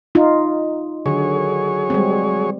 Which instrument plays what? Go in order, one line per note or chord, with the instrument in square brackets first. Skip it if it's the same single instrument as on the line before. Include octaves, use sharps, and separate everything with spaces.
[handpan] D#4 F4
[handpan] D3 D#3 [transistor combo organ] F#3 G#4 C#5
[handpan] G3 G#3 C4